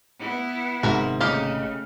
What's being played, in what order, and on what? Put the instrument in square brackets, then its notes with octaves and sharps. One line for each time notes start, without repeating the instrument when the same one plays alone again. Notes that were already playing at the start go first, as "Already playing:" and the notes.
[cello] B3 E4
[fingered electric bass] G#1 C3 [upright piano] G#2 [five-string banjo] F#4 A#4 E5
[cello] C#3 A3 [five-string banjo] A#3 D#4 G4 [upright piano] F6